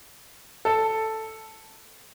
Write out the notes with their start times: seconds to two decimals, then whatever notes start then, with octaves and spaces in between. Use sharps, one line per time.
0.65 A4